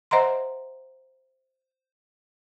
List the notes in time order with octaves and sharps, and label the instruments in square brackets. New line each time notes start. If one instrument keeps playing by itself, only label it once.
[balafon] C5 D#5 E5 F#5 A#5 C6